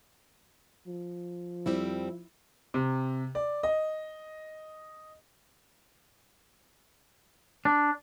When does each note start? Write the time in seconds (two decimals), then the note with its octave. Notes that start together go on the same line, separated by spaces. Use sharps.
0.88 F3
1.66 F2 G3 C4 E4
2.74 C3
3.35 D5
3.63 D#5
7.65 D4